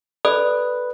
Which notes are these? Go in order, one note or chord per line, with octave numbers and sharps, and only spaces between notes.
A4 B4 D5 D#6